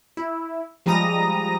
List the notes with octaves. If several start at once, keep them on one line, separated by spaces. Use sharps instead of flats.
E4
F3 G3 G#3 A#5 D#6 A#6